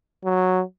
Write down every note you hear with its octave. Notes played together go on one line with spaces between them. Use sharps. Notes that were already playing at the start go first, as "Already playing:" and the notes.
F#3